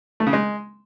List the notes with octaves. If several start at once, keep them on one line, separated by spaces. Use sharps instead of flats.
A3
C#3
G#3